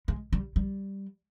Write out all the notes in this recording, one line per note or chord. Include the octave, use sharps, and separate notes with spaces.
G#3
G3
G3